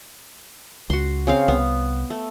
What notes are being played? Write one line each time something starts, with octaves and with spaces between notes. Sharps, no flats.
C#2 F#4 C6
C#3 C4 F5
C2 B3
A3